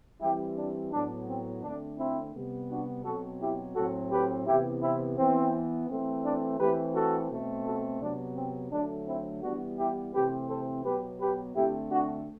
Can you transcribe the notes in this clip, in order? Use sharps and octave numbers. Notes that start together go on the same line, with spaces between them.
E3 G3 C4 E4 G4
D4
A2 F#3 B3 D4
C4
D3 A3 C4 D4
C4 E4
C3 G3 B3
D4 F#4
B2 F#3 C4 F#4 A4
E4 G4
A2 F#3 A3 C4 F#4 A4
G4 B4
C3 E3 B3 E4 G4
C4 E4
E3 B3 C4
E3 A3 C4
D4
E3 A3 C4 G4 B4
F#4 A4
B2 A3 C4
F#4 A4
C3 F#3 B3 D4
C4
D3 F#3 A3 D4
C4 E4
E3 G3 B3 D4 F#4
E4 G4
C3 E3 A3 C4 G4 B4
A4 C5
B2 F#3 B3 G4 B4
G4 B4
D3 A3 C4 E4 G4
D4 F#4